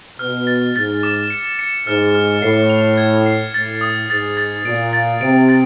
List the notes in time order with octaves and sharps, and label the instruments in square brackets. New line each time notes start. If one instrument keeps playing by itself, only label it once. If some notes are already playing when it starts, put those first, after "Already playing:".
[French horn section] B2 [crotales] F6
[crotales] A6
[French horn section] G#2 [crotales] A6
[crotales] D6
C#7
C#7
[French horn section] G#2 [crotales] F6
[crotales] F6
[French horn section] A2 [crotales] C7
[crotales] F7
G#6
C7
[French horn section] A2 [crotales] A6
[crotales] D#6
[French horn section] G#2 [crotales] A6
[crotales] A6
[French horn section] A#2 [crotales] D7
[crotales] A6
[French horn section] C3 [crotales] D7
[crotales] A6